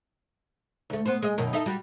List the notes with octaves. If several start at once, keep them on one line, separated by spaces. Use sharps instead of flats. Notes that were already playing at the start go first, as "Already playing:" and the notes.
D2 A3
B3 C5
G#3 D#5
F#2 B2 D#3
D#4 E4 A4
G3 F#4